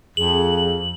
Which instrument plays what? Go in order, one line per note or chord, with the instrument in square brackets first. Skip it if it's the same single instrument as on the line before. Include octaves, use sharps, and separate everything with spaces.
[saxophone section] F2 [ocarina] G#4 [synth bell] F#7